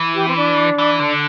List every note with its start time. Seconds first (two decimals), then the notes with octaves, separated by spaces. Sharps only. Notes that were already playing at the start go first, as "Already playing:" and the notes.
Already playing: E3
0.15 G4
0.28 C4
0.37 D4
0.78 E3
0.99 D3